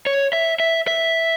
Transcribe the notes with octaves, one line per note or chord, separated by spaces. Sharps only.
C#5
E5
E5
E5